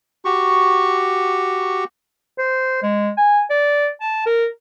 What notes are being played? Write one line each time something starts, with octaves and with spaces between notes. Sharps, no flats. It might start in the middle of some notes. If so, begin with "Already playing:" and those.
F#4 G4 C#6
C5
G#3
G#5
D5
A5
A#4